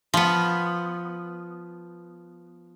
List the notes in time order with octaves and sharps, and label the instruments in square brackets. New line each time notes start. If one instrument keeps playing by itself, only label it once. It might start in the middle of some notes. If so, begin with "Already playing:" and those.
[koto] F3 B3